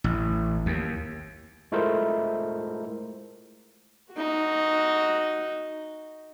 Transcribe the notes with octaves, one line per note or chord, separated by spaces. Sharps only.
A1
D#2
G#3 A3 E4 F4 A#4 C5
D#4 F#4